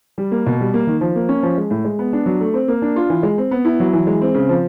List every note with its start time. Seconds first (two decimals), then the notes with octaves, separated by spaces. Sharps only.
0.18 G3
0.32 A#3
0.46 B2
0.60 G3
0.74 A#3
0.87 D#3
1.01 F3
1.16 A#3
1.29 C#4
1.43 F3
1.58 G#3
1.71 A2
1.85 G#3
1.99 B3
2.13 D4
2.26 F#3
2.40 A3
2.54 C4
2.68 A#3
2.82 D4
2.96 F4
3.10 E3
3.23 G#3
3.38 C4
3.51 B3
3.65 E4
3.80 F#3
3.93 E3
4.07 G#3
4.21 C4
4.34 C#3
4.49 F3